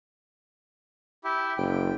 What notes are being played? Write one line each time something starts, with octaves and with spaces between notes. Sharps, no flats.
E4 G4 E5
F#1 G5